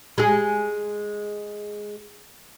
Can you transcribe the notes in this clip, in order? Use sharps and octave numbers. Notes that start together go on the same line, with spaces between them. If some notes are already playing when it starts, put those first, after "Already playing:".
G#3 G#4